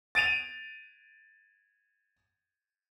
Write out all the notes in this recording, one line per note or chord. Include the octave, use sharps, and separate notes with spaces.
A6 D7 D#7 F7